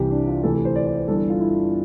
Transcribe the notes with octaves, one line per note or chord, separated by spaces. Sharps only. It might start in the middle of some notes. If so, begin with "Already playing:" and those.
Already playing: C2 C3 E3 G4
D4
F4
D2 C3 E3 A4
A4
C5
D5
D5
C5
G1 G2 E3 A4
A4
F4
E4